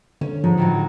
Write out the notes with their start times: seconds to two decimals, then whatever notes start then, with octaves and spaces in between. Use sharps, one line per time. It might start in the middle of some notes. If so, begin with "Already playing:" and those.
0.21 D3 C#4
0.44 G#2 F3
0.57 A2 D#3 F#3